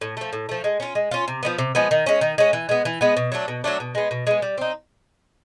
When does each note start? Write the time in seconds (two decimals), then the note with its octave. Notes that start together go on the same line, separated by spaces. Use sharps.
0.01 A2
0.17 F3 A3
0.33 A2
0.49 F3 A3
0.64 G#3
0.80 C#4 F4
0.95 G#3
1.11 C#4 F4
1.28 C3
1.43 F3 G#3 B3
1.58 C3
1.75 F3 G#3 B3
1.91 D#3
2.06 G#3 C#4
2.21 D#3
2.38 G#3 C#4
2.53 E3
2.69 G#3 B3
2.85 E3
3.01 G#3 B3
3.17 B2
3.32 F#3 A3 D4
3.48 B2
3.64 F#3 A3 D4
3.80 B2
3.95 G#3 B3
4.11 B2
4.27 G#3 B3
4.42 G3
4.58 C4 D#4